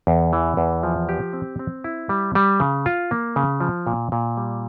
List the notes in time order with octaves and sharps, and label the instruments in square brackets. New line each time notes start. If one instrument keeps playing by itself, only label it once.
[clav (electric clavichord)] E2
E3
E2
F3
G4
C4
C4
E4
G3
G3
C#3
F4
A#3
C#3
F3
A#2
A#2
G3